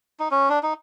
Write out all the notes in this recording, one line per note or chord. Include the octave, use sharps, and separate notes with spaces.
D#4
C#4
D4
D#4